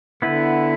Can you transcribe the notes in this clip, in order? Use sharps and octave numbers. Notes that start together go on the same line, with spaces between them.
D3 B3 E4 B4